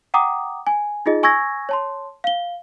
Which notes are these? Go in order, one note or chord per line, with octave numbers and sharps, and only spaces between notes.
F#5 G5 A#5 D6 D#6
G#5
D#4 F4 G#4 D#5
G#5 C#6 E6 G#6 A#6
C#5 A5 C6
F5 G7